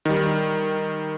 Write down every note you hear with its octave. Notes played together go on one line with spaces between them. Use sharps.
D#3 G3